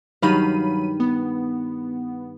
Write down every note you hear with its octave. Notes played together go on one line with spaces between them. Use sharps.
G2 D#3 F#3 F5 B5 D#7
B3